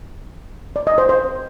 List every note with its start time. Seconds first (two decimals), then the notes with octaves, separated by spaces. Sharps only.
0.76 D5
0.87 D#5
0.98 C5
1.09 C5